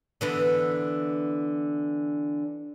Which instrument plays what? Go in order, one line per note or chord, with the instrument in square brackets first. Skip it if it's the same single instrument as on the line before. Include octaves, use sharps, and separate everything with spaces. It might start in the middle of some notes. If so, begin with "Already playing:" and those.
[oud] D3 E3 B3